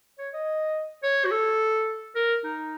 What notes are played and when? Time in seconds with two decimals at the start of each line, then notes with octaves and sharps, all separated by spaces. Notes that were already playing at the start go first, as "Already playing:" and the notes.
0.18 C#5
0.33 D#5
1.03 C#5
1.25 F#4
1.31 A4
2.15 A#4
2.44 D#4